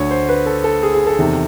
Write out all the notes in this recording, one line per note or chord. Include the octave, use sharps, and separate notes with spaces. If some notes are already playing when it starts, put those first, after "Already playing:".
Already playing: D2 D3 C#5
C5
B4
A4
A4
G#4
G#4
A4
E2 C3 D#3